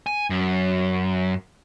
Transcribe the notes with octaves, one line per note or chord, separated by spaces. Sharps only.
G#5
F#2